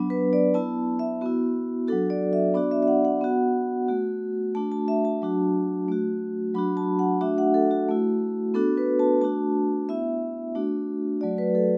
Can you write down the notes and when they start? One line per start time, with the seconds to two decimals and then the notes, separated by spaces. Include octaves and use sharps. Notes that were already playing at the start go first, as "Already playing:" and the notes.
Already playing: F#3 B3 D4
0.10 B4
0.33 D5
0.54 B3 E4 A5
0.99 E5
1.21 B3 E4 F#4
1.88 F#3 D4 F#4 A4
2.10 D5
2.33 E5
2.54 B3 D4 F#4 D5
2.71 E5
2.82 E5
2.88 F#5
3.05 F#5
3.21 B3 F#4
3.89 A3 F#4
4.55 A3 D4 F#4 A5
4.72 A5
4.88 E5
5.05 A5
5.22 F#3 D4 F#4
5.88 A3 F#4
6.55 F#3 D4 F#4 B5
6.77 A5
6.99 F#5
7.21 A3 D4 F#4 E5
7.38 F#5
7.54 A4
7.71 F#4
7.89 A3 E4
8.54 B3 D4 F#4 A4
8.77 B4
8.99 A5
9.21 A3 D4 F#4 A5
9.89 B3 E4 E5
10.55 A3 D4 F#4
11.21 F#3 A3 F#4 D5
11.38 B4
11.55 A4